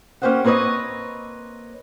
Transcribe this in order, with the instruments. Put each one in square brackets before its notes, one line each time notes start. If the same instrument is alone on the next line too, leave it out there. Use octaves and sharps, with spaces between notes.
[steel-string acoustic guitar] A#3 C#4 G4 C5 D#5 F#5
A#3 C4 B4 C#5 D#5